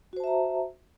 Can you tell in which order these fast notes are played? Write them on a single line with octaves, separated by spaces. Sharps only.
F#4 C5 A5 E5 A#5